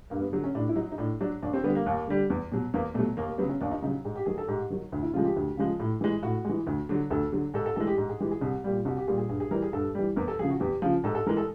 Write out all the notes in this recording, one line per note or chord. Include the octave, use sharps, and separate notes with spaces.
G2 A#3
B3
D3 F#3
C#4
A2 D4
E4
F#3 D#4
D#4
A2 D4
F#3 D4
D#2 D4
C4
D3 G3 B3
A#3
D#2
D3 G3
E2
B2 F#3
E2 A#3
B2 F#3 A3
D#2 A#3
A#3
C#3 F#3 B3
C#4
D#2 D4
D#4
C#3 F#3 D#4
G#2 G#4
G4
D#3 F#3 G#4
A4
G#2 G4
D#3 F#3
D2
E4
C#3 F3 G#3 F4
G4
D2
C#3 F3 G#3
A2
E3 G#3
A2 F#4
E3 G#3
D2
D3 F#3
D2 A4
D3 F#3
G#2 A4
A4
E3 G#3 A4
G4
G#2
G#4
E3 G#3 G4
G#4
C2
A#2 G3
C2 F#4
G4
A#2 G3 G#4
G#4
G2 G#4
G#4
E3 G3 A#4
G#4
G2 A4
E3 G3
E2 A#4
A4
C#3 F3 G#4
F#4
E2 G4
C#3 F3
G#2 A4
A4
E3 G#3 A#4
A4